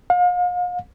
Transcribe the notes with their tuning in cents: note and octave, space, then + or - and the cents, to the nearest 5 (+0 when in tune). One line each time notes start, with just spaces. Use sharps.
F5 +40